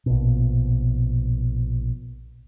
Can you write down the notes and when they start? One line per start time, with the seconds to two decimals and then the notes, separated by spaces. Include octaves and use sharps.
0.06 A#1 B2